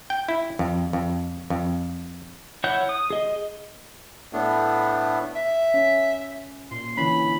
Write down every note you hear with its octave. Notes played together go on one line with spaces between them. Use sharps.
G5
E4
F2
F2
F2
E4 C#5 F#5 F#6 G6
D#6
G#4 D#5
A2 A3 B3 D4
E5
C#4
A#2 C6
D3 E3 C#4 B5